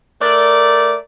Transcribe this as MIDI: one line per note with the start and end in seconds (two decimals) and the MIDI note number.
0.21 0.96 57
0.21 0.96 70
0.21 0.96 74